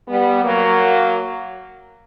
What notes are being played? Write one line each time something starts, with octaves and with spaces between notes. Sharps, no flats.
G3 B3
F#3 A#3